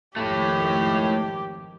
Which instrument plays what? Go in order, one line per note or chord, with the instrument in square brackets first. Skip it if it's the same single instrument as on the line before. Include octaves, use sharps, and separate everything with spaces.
[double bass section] G#1 F2 D#3 [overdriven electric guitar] A2 A3 [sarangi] G4